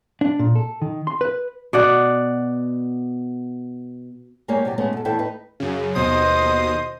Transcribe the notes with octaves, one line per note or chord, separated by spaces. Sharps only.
D4
A#2
A4
D#3
C6
B4
B2 D5 F#5
G#3 A#3 G4 C#5 D5 G#5
C3 F#3 G4 D5
G#3 A3 B3 C#4 D#4
B2 A4
E2 A2 E4 A4 G5 A5
D#4 B4
F#2 C#3
D#2 B2 C5 D#5 D#6